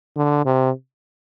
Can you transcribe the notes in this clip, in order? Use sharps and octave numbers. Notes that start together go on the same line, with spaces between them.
D3
C3